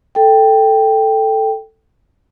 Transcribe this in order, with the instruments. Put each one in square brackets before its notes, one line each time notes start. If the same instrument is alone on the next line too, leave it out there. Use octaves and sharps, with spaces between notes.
[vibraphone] A4 G5